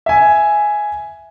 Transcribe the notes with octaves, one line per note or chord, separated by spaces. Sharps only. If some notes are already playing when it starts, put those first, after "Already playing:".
E5 G#5